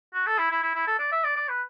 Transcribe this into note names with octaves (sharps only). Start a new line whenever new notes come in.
F#4
A4
E4
E4
E4
E4
A4
D5
E5
D5
D5
B4